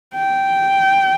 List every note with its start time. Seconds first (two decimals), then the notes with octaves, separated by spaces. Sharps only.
0.15 G5